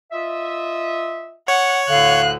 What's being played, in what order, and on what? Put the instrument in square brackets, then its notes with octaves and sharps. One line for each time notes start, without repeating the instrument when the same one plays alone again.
[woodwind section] F4 D#5 E5
[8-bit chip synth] C#5 [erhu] F#5
[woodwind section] D2 A2 D3 [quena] F5 [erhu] F#6